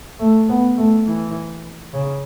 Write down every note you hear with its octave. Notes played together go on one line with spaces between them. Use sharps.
A3
B3
A3
E3
C#3